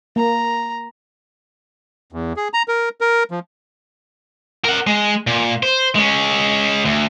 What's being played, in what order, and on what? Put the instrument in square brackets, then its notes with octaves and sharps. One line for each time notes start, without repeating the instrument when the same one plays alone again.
[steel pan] A#3 [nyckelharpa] A#5
[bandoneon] E2
G#4
A#5
A#4
A#4
F3
[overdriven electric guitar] A#4 F#5
G#3
A#2
C5
G#3 C#4
D2